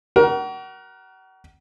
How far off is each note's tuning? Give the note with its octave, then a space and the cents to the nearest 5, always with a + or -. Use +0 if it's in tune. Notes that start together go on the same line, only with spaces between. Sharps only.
F#4 +35 A#4 +20